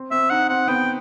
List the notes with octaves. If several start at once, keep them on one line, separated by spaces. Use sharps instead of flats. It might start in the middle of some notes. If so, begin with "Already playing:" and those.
Already playing: C4
C4 E5
D#4 F#5
C4 F#5
B3 G5